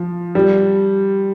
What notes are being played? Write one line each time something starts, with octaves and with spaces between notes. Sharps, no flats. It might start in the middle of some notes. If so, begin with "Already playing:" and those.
Already playing: F3
G3